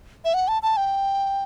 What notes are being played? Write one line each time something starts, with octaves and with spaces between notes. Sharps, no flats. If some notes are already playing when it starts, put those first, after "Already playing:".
E5
F#5
A5
A5
G5